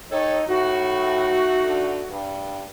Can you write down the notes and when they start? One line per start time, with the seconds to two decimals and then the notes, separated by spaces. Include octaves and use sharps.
0.11 D#4 G4 A4 C#5
0.47 A2 A3 D#4 F#4
1.64 D3
2.10 G2